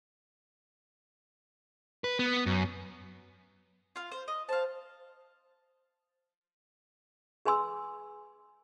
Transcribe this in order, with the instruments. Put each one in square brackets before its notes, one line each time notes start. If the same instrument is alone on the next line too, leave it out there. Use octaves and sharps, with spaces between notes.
[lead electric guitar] B4
B3
F#2
[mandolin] F4 F5
C5
D#5
[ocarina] C5 [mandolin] F5 A5
[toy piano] G#4 B4 G#5 C6 E6